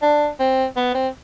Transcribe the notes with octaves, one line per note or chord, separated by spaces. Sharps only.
D4
C4
B3
C4